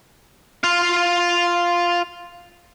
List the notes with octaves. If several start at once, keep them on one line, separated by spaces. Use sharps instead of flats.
F4 F5